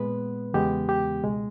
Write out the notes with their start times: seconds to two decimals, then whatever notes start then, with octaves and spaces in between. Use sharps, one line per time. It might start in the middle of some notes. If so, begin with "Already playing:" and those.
Already playing: A#2 G#3 B3 B4
0.54 E2 C#3 E3 G#3 B3 G4
0.89 G4
1.23 C#2 B2 G#3